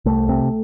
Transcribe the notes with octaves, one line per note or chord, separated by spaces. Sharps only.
C2 A3
C3